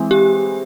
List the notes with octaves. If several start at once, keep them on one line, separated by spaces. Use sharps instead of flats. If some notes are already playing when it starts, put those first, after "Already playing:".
Already playing: E3 G#3 C4 E4
G4